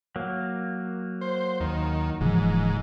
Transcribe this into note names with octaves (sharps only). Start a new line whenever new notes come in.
F#3 A#3
C5
D#2 D#3
D#1 G#2 C#3 E3 F3